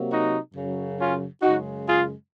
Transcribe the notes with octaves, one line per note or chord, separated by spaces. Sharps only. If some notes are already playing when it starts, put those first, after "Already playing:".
Already playing: C3 F#3 A#3
D#4 F#4
F#2 C#3 F#3
C#4 F4
F#2 C#3 G#3 D#4 F#4
F4 G#4